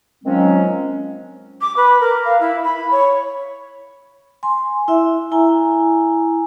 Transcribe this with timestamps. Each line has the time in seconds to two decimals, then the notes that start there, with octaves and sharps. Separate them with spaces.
0.24 D#3 F3 F#3 G#3 C4 C#4
1.61 D6
1.76 B4
2.00 A#4
2.25 F5
2.40 E4
2.63 B5
2.91 C#5
4.43 G#5 C6
4.88 E4 E5
5.32 E4 G#5 A#5